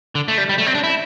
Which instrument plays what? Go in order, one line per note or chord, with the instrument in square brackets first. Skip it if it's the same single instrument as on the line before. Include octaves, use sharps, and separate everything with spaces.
[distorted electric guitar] D3
A3
G3
G3
A3
C4
D4
E4